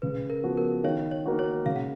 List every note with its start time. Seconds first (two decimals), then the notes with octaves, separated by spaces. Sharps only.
0.02 C#3 B4
0.30 A#4
0.43 F3 B3 F#4
0.57 A#4
0.84 D#3 C#5 F5
1.11 C#5
1.26 A#3 D#4 F#4
1.39 C#5
1.66 C#3 F5
1.76 F#5